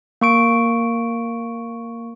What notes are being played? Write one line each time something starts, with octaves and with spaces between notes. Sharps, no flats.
A#3 C#6 D7